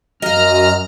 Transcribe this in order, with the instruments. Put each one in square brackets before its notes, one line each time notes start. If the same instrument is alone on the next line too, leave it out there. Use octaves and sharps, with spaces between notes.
[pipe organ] F#2 A#5 F6 [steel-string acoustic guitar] D#5 F5